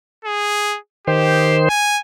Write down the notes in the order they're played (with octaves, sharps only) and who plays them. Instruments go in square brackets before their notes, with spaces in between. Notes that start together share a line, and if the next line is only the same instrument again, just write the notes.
[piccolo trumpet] G#4
[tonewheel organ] D#3 C5 [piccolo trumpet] G4
[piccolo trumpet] G#5